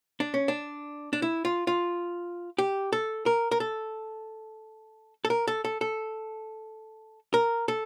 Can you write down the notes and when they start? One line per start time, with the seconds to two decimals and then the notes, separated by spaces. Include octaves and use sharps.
0.20 D4
0.34 C#4
0.48 D4
1.13 D4
1.22 E4
1.45 F4
1.67 F4
2.58 G4
2.93 A4
3.26 A#4
3.51 A#4
3.60 A4
5.25 A4
5.30 A#4
5.48 A4
5.65 A4
5.81 A4
7.34 A#4
7.68 A4